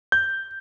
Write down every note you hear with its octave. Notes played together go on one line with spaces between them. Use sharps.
G6